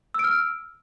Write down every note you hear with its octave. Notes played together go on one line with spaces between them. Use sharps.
E6 F6 D7